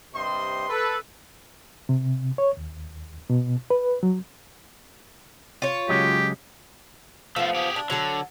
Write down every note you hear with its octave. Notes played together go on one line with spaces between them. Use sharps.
G2 C3 C5 D#5 C6
A4 B4
C3
C#5
D#2
B2
B4
F#3
F4 C#5
C#3 F#3 G#3 G4
F3 A3 B3 F4
G4 G#4
D4
D3 F#3 A4